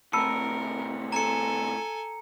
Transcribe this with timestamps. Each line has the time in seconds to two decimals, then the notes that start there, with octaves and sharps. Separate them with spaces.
0.13 A2 C3 A#4 A5 B5 E6 C#7
1.12 A4 G#5 A#5 C#7